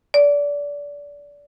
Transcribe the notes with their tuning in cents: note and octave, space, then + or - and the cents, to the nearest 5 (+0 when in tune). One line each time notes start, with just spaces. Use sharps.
D5 -25